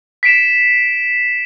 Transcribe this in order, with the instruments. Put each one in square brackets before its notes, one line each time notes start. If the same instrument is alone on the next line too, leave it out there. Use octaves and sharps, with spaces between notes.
[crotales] B6 C7 D7 E7